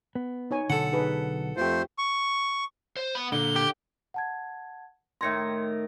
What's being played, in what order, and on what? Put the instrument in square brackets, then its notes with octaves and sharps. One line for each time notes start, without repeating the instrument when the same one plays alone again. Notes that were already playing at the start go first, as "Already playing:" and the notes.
[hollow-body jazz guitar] B3
[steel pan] D#4 C#5 G#5
[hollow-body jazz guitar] B1 F#2 D3 [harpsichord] A4 F#5
[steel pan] D#4 G#4 B4
[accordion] F2 A3 C5 [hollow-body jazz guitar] F4 G4
[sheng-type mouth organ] C#6
[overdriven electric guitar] C5
B3 B5
[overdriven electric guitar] A#2 [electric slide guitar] D3 [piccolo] G7
[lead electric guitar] G4
[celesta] F#5 A5 G#6
[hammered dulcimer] A2 D#3 A#5 [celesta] C6 G#6 C#7